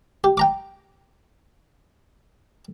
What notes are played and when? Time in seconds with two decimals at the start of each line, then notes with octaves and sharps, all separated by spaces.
0.24 G4
0.37 G5 A#5 D6